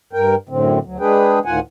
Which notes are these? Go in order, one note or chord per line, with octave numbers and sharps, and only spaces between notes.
G2 A#4 G5
F#2 A2 D3 C4
D2 F#3
G#3 D4 G#4 B4 G5
D2 A2 D#3 F4 F#5 G#5